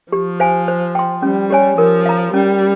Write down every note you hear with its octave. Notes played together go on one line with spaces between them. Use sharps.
F3 G4
C5 F5 G#5
C5
G5 C6
G3 C#4
G4 C#5 G#5
F3 A#4
F5 A#5
G3 C#4